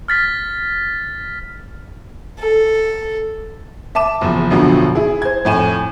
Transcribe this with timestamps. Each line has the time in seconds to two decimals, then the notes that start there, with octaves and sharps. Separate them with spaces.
0.08 F6 A6 B6
2.39 A4
3.95 E5 A5 D6 E7
4.21 F#1 E2 F3
4.51 A1 F#2 B2 D3 F3
4.95 E4 G#4
5.22 C5 G#6
5.45 F2 A2 G#5 E7